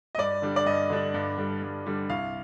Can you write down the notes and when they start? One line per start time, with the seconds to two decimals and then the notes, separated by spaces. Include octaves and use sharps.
0.15 D#5
0.18 G2 D5
0.42 D3 G3 D4
0.56 D5
0.66 G2 D#5
0.90 D3 G3 D4
1.14 G2
1.37 D3 G3 D4
1.62 G2
1.86 D3 G3 D4
2.09 C2 F5